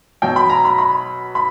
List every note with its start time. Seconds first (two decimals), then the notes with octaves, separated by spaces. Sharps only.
0.22 B2 F#3 G5
0.36 B5
0.50 A#5
0.65 B5
0.78 B5
1.35 B5